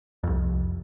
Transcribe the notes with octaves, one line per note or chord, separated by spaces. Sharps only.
C2 F2